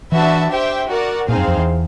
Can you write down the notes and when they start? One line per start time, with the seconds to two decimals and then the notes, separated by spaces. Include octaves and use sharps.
0.12 E3 D4 F#4 B4 E5 A5
0.51 G4 C5 E5 G5
0.89 F#4 A#4 D5 F#5
1.28 A#2 C4 D#4 G#4 C5 F5
1.37 F#2
1.48 F2
1.57 E2